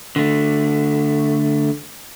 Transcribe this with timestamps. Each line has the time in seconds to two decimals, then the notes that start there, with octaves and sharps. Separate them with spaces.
0.16 D3 A3